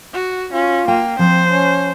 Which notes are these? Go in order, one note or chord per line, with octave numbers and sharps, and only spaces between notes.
F#4
C#4 F4
A#3 G5
F3 C4 C5
C#4